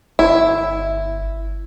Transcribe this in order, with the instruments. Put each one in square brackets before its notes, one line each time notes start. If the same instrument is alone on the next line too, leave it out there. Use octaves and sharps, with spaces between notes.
[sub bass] G1 [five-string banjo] E4